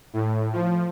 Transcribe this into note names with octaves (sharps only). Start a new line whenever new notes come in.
A2
F3